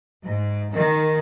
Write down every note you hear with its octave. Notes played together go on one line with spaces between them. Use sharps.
G#2
D#3